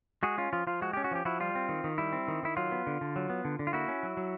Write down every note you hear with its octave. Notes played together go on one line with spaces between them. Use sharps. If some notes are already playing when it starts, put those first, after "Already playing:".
G#3 F#4 G#4
C#4 F4
F3 F4
F3 F4
G#3 F#4
C#4 G4
F#4
F3 G4
F3 E4 F#4
G3 F4
C4
D#3
D#3
G3 E4
C4
D#3
D#3 E4
F#3 F4
B3
D3
D3
F#3
B3
D3
D3
F4
A#3 E4 F#4
C#4
F#3
F#3